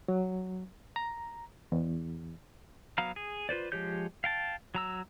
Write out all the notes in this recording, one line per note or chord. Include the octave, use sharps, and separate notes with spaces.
F#3
A#5
E2
F#3 B3 F5 A#5 F6
G#4
F4 B4 C5 D5
F3 G#3 G4 C#5 G6
F5 G5 A5
F#3 A#5 E6